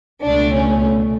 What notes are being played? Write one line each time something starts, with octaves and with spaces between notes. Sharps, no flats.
C#2 B2 A3 D4
C#4